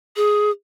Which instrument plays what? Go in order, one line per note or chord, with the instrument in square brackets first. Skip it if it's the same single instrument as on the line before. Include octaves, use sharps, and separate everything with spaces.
[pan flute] G#4